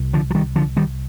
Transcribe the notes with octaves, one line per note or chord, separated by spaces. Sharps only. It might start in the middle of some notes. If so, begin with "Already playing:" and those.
Already playing: C2
D3 F3
F3
D#3 G3
D3 F3
D#3 G3